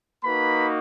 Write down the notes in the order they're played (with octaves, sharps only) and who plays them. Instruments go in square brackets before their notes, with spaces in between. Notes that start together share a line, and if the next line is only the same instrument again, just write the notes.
[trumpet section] A#3 D#4 F#4 B4 B5